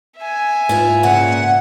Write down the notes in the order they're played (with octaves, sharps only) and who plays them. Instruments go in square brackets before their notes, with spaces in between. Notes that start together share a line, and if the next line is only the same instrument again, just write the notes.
[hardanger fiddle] E5 G#5
[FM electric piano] G#2 [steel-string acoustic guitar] E4 F4 B4
[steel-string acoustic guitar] A#2 C#3 A#3 [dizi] F#5